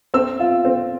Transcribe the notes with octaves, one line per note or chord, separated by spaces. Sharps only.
C4 E6
F4
C4